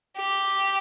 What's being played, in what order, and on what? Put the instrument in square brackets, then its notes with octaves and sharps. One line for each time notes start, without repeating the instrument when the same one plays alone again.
[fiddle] G4